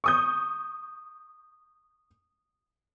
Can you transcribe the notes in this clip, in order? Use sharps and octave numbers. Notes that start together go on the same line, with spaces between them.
C#6 D#6 G6